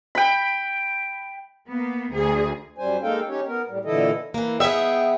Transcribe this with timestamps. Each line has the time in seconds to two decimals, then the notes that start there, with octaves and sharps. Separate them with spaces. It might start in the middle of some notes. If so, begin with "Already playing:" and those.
0.15 G5 B5
1.69 A#3 B3
2.14 D2 G#4
2.78 F#2 G3 C5 G#5
3.03 G#3 A#3 D#4 A4 F5 G5
3.28 C#4 D#4 G4 C#5
3.47 B3 A#4
3.68 A2 G3
3.85 A#2 D3 E3 E4 A4 D#5
4.34 E3 A#3
4.60 B3 G#4 E5 G5